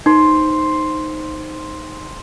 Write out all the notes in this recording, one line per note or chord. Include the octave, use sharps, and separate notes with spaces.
D#4 C5